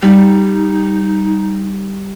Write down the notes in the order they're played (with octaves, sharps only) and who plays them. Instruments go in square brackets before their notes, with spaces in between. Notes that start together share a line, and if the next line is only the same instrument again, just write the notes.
[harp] G3 [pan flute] D#4